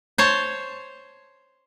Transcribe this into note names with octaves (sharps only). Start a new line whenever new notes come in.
C5 C#5 A5